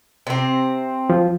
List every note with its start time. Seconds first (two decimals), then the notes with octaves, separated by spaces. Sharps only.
0.27 C3 C4
1.10 F3